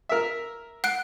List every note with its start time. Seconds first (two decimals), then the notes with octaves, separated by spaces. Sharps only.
0.09 A#4 E5
0.84 F#5 F#6 D7